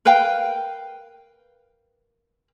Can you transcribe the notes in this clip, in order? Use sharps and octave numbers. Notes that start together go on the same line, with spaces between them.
A#4 B4 F5 G5